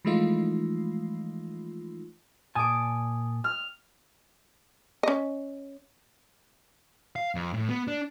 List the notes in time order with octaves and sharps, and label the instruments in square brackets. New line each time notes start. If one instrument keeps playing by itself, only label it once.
[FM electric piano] E3 F3 G#3 A3 D#4 F4
[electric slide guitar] A#2 G#5 A5 [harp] D6 D#6
[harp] F6
[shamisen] C#4 D#5
[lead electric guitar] F5
F2
A2
B3
D4